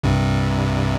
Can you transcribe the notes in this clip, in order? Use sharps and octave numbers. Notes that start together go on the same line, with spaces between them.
C2 G2 C3